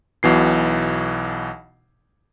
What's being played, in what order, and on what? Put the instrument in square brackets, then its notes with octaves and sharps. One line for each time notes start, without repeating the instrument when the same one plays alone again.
[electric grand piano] B1 B2 E3 C7